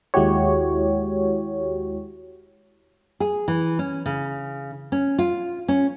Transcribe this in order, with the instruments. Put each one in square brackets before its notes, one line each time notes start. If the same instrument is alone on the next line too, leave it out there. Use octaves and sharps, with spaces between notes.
[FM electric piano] D#2 G#3 E4 F#4 G4 C#5
[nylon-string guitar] G#4
E3
C#4
C#3
C#4
F4
C#4